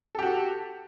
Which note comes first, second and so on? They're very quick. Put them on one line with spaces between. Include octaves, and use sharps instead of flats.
A4 G4 F#4